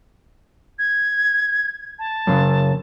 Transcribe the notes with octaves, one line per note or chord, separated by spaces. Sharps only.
G#6
A5
F#2 C#3